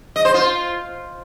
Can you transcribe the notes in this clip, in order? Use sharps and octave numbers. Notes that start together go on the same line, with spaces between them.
D#5
C5
F4